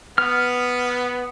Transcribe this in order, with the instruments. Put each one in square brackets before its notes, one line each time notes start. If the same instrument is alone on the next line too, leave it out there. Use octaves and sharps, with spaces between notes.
[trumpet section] B3 [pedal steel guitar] F6